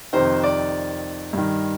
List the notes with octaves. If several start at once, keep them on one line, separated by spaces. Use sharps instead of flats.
F2 C3 D#3 C5
D5
G2 D#3